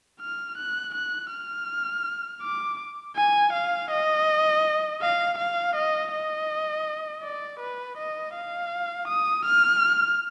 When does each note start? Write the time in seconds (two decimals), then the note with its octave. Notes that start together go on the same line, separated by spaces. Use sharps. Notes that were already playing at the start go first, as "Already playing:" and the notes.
0.21 F6
0.58 F#6
0.95 F#6
1.32 F6
2.42 D6
3.16 G#5
3.53 F5
3.91 D#5
5.02 F5
5.38 F5
5.76 D#5
6.12 D#5
7.24 D5
7.60 B4
7.98 D#5
8.34 F5
9.08 D#6
9.45 F6